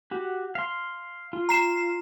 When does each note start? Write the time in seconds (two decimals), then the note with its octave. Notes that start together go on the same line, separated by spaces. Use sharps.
0.11 F#4 G4
0.55 F5 C6
1.33 F4
1.49 A#5 C7 E7